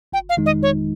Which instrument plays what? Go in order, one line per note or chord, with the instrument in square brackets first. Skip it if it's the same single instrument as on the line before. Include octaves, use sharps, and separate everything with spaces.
[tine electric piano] G1 [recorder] G5
[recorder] F5
[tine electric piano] F2 D#3 G#3 D#4
[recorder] D#5
[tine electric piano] G1 [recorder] C#5